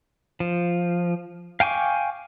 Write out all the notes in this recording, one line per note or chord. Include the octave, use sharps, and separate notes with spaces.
F3
F5 G5 G#5 C#6 D6